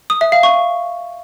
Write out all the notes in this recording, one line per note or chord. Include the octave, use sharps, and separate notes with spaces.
D#6
E5
F5
C#6